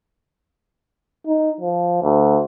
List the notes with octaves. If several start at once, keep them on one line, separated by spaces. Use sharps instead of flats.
D#4
F3
D2